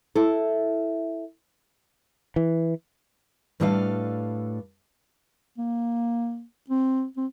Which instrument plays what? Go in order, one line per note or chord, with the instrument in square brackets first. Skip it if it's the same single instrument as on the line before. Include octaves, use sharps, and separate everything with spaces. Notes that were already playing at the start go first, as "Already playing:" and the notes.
[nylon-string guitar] E4 A4
[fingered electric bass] E3
[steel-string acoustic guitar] A2 G3 D4 A4 B4 F5
[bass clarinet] A#3
C4
C4